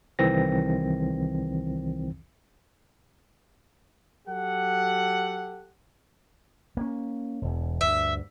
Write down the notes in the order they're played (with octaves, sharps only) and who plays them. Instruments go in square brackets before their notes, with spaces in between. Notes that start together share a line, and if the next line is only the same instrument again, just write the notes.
[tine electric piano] C2 D#3 E3 C4 A#6
[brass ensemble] F#3 G4 A4 F#5
[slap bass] A#3 C#4
E1 E2
[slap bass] D2 G2 [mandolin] E5